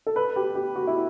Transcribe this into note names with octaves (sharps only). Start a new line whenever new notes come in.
A4
B4
G4
G4
F#4
E4